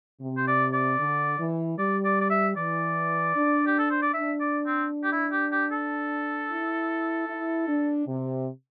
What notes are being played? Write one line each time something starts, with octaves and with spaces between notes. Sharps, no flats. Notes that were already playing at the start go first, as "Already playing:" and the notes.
C3
C5
D5
D5
D3
E3
G3 D5
D5
D5
E5
E3 D5
D4
G4
A4
C5
D5
D4 E5
D5
C4
G4
E4
G4
G4
A4
E4
E4
D4
C3